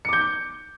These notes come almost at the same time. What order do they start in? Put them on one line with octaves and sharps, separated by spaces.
C#7 D6 G6